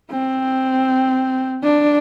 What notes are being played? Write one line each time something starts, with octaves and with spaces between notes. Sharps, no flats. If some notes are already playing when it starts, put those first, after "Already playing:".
C4
D4